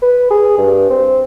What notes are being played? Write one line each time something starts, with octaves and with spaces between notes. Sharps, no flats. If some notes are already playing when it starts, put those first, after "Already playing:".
B4
G#4
G2
C4